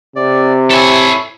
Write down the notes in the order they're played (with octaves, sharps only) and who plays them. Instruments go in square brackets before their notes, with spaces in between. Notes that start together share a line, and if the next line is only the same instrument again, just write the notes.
[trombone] C3 [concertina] D5
[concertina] E4 C#5 [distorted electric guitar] A4 G#5